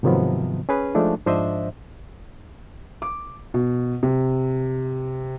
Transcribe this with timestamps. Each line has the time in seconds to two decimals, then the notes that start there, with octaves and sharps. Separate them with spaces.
0.03 G#2 C3 D#3 F3 F#3 B3
0.69 C#4 G#4 B4
0.95 F3 G#3 A3 D4 D#4
1.26 G#2 F3 D4 C5 D#5 E5
3.02 D6
3.54 B2
4.03 C3